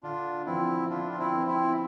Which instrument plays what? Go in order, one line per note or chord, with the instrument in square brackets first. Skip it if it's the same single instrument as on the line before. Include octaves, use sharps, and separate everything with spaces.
[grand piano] D3 [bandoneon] D4 F4
[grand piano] F3 B3 [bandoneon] C4 E4
[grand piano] D3 [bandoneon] D4 F4
[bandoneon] F4
C4 E4
[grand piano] F3 B3
[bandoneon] C4 E4